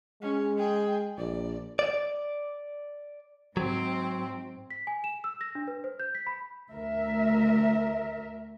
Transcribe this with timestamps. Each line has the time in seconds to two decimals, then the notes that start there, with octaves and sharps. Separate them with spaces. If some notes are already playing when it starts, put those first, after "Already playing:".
0.22 G#3 C#4
0.57 G#4 G5
1.18 A#1 D5
1.79 D5
3.57 G#2 F#3 C4
4.71 B6
4.87 G#5
5.04 E7
5.24 E6
5.41 A#6
5.55 D4
5.68 B4
5.84 C5
6.00 G6
6.15 B6
6.27 B5
6.70 D2 A#4 E5